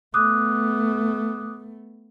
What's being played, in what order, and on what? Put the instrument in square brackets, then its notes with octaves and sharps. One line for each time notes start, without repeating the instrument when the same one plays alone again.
[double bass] A3 B3 [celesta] D6 D#6 F#6